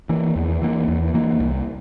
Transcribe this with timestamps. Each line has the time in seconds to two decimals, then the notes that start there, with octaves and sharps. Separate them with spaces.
0.09 E3 A#3
0.36 E2
0.62 E3 A#3
0.88 E2
1.14 E3 A#3
1.40 C2